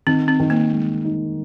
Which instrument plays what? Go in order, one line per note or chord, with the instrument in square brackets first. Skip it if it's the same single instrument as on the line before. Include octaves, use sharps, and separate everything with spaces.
[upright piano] D#3 [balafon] C4
[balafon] C4
[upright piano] D#3
[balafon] A#3
[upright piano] G#3
D#4